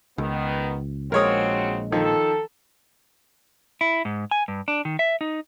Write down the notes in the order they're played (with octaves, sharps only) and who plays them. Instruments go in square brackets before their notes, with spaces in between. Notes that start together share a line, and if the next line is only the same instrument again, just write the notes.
[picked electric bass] C#2 [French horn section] D#3 B3
[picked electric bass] A#1 G#3 [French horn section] C#3 C4 F#4 [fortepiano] A#4 C#5 D#6
[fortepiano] D#3 F3 [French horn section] A4
[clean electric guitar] E4
G#2
G#5
G2
D4
D#3
E5
D#4